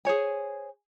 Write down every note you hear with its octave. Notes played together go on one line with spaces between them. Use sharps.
G#4 C5 C#5 G#5